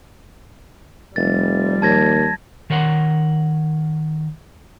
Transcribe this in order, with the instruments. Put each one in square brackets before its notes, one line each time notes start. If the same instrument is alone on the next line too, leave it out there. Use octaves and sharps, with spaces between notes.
[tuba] F1 [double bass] F3 G3 [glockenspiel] A6
[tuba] D#2 [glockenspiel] A5 G#6 A#6
[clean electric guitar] D#3 A#4 C#5 F#5 C6